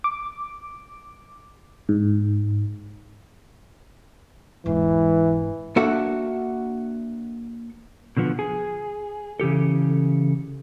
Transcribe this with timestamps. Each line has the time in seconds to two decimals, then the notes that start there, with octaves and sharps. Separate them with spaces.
0.04 D6
1.89 G#2
4.66 E1 G#2 E3
5.76 A#3 D4 F#4 A4 E5 F#5
8.17 B2 D3 F3 B3
8.39 G#4
9.40 C#3 E3 G4 A4